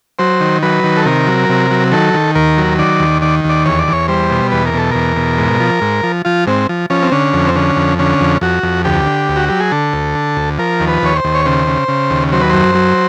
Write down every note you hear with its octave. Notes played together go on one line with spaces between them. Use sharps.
F#3 C5
D#3
F#3 B4
D#3
A4
C3 A#4
F#3
C3
F#3
D#3 A4
D#3
D#2 A#4
F#3
D#3 D5
D#2
D#3 D5
D#2
D5
E2 C#5
D5
E2 C#5
G3 C5
B2
E2 B4
A#4
B2 A4
E2 A#4
B2
G#2
F3
G#2
F3
F3 F4
G#2 C4
F3
F3 C#4
C4
D3 C#4
F2
C4
D3 C#4
F2
D3 C#4
F2
F2 F#4
F2
D2 G4
D3
D2
F#4
F#3 G4
G#4
D3 A4
D2
D3
D2
F3 A#4
D#2
B4
D#2 C#5
C5
D#2
C#5
C#3 C5
C#3
C#3
D#2
F#3 C5
B4
F#2 C5
F#3